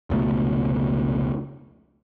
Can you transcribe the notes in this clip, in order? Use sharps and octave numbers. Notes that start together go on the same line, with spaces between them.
F1 C#2 B2 A3